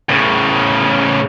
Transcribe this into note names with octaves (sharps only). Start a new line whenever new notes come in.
A2 C#3